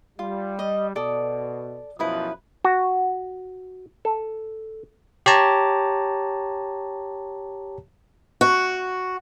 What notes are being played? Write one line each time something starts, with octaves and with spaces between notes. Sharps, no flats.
G3 F4
D#5
B2 A4 D5 D#6
F#2 B2 F3 E4 B4 D#6
F#4
A4
G4 C#5 A5 A#5
F#4